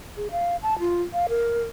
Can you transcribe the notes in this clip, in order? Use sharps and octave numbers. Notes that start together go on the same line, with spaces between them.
G#4
F5
A5
F4
F5
A#4